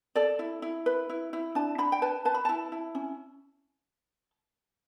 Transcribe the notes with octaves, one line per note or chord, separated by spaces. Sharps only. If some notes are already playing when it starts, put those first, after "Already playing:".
A4 D5
E4
E4
B4
E4
E4
D4 A5
D4 B5
G5
B4 A5
B4 A5
B5
E4 A5
E4
C#4